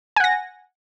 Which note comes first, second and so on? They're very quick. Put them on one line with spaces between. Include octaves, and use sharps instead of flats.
G#5 F#5 A#6